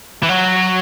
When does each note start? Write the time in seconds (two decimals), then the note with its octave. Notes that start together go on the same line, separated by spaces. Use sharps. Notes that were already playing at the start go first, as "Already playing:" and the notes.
0.23 E3
0.29 F#3